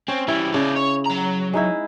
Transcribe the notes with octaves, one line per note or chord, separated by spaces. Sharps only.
C4 C#4
E3 G3 E4
C#3 D#4 D5
C#5
F#3 A#5
G#3 D#4 E4